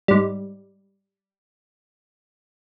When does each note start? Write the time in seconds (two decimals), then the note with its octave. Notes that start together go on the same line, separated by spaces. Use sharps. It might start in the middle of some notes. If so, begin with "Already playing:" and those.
0.08 G#2 G3